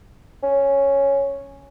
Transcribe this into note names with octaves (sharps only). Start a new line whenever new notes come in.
C#4